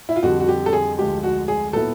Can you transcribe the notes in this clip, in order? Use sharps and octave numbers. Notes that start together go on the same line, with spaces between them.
E4
F4
F2 D3 G3 F#4
F#4
G4
A4
G#4
D2 D3 F3 G#3 G4
F#4
G#4
A#2 F#3 B3 E4 A4